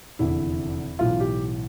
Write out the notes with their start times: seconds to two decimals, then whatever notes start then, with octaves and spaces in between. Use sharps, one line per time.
0.19 F1 E2 D3 E4
0.99 B1 A2 E3 F4
1.20 G4